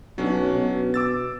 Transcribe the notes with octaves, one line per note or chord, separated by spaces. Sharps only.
B1 F#3 C#4 D4
B2
D6 E6 A6